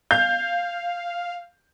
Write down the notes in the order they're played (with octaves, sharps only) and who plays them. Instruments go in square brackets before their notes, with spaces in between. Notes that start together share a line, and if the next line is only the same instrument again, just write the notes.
[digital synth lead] F5 [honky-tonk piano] G6